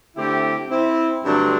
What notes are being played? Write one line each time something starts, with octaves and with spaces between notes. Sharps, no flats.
D3 A3 C4 E4 G4
C4 E4
G2 D3 F#3 A3 C4 D4